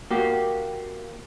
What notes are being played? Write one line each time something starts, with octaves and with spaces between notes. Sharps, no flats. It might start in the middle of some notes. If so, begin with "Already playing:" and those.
A#3 F#4 G4